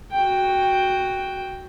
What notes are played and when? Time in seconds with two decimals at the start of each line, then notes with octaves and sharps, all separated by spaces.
0.12 F#4 G5